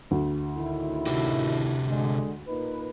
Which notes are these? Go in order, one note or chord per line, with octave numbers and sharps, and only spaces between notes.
D2
A2 D#3 E4
C3 F#4 G4
D3 G#3
A#2 D#4 B4